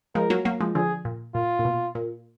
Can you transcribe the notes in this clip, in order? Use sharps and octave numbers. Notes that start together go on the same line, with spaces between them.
F3 G#3 A#4
F#3 A#3
F#3 A#3
F3 G#3
D3 F3 G#4
A#2
A#2 F4
A#2
B2
A#2